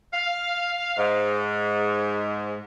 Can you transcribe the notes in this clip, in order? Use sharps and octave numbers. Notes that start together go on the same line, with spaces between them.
F5
G#2